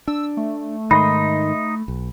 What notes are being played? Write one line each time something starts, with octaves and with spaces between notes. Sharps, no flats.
D4 E6
A3
G#2 D#3 D#4 D#5 B5 C6
B1